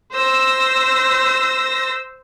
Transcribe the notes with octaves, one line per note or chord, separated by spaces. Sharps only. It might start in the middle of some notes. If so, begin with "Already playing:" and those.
C5 E6 A#6